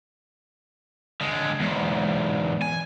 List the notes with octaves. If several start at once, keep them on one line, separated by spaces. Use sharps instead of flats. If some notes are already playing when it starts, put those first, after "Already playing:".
D3 G#3
E2 G#2
G#5